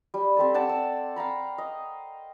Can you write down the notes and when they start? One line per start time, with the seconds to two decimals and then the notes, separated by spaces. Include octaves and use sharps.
0.14 G3
0.37 C4 G4 A4 A5
0.54 D5 F#5 G5 A5
0.69 E6
1.16 F5 G5 A#5 B5
1.58 D#5